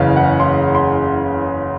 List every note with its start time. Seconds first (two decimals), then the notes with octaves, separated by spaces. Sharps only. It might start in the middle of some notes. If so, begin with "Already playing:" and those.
Already playing: F#1 E2 C#3 B4 F5
0.16 F#5
0.40 C6
0.75 C6